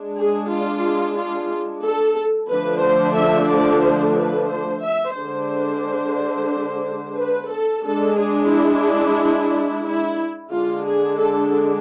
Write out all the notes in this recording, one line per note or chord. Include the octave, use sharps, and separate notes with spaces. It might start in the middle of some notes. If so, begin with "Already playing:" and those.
Already playing: G#3 D4
G#4
F4
F4
A4
D3 F3 A3 D4 B4
C5
E5
D5
C5
B4
C5
E5
D3 G#3 D4 C5
B4
A4
G#3 D4 A4
G#4
E4
E4
D3 G#3 D4 F4
G#4
A4